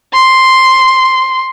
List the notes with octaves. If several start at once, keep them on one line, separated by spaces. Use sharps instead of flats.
C6